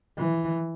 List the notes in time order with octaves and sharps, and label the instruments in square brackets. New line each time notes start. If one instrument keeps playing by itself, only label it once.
[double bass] E3